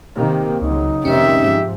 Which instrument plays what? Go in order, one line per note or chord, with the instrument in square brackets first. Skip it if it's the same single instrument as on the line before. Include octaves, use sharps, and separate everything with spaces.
[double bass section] C3 D#3 A#3 [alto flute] G4
[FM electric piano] C#2 [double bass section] C#3 F#3 [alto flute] D#4
[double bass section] F1 D#3 C4 [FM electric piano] C#4 [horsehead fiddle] G4 E5
[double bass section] G#2 F3